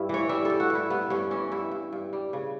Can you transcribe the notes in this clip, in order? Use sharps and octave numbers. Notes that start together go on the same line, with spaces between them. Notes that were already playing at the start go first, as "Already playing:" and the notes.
Already playing: G2 E4
E3 C#5
G3 E5
G3 A4
F#4
G2
E4
G2 B3
G2 C#4
E3 C#4
G2 E4
G2
G2
G3
C#3